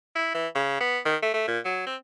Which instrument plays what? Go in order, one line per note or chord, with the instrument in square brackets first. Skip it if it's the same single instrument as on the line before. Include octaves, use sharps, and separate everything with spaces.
[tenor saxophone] E4
E3
C#3
B3
D#3
A3
A3
A#2
F#3
C4